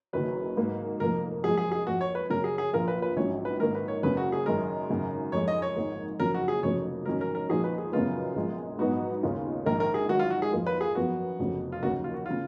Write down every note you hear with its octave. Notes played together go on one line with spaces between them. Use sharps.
F#1 F#2 D#3 F#3 B4
G#2 F#3 A#3
F1 F2 F3 A#3 A#4
F#2 F3 G#3 G#4
G#4
G#4
F2 F3 A#3 F#4
C#5
B4
F#2 C#3 F#3 C#4 A#4
G#4
G#4
A#1 A#2 F3 A#3 F4 A#4
B4
B4
A#1 G#2 F#3 C#4 C#5
B4
G#2 D#3 A#3 A#4
B4
C#5
F#1 F#2 C#3 B4
F#4
G#4
F#2 D#3 G#3 A#4
G#1 F#2 C#3
F2 F3 G#3 C#5
D#5
C#5
G#1 G#2 D#3 A#3
F#1 F2 C#3 F#3 A#4
F#4
G#4
F1 F2 C#3 F#3 A#3 C#5
G#2 D#3 F#3 C#4 A#4
A#4
A#4
A#2 F3 G#3 D#4 F#4 G#4
B4
G#4
F#2 C#3 G#3 B3 F4
A#1 A#2 G#3
G#2 F#3 B3 D#4 F#4
D#2 C#3 G#3 C#4 F4
A#1 G#2 D#3 A#3 A#4
A#4
G#4
G#1 G#2 D#3 F#3 F#4
F4
F#4
G#4
F2 D#3 A#3 F4
B4
G#4
F#2 F3 B3 F#4
F1 F2 C#3 F#3
F4
D#2 C#3 F#3 A#3 F#4
F4
F#4
C#3 F4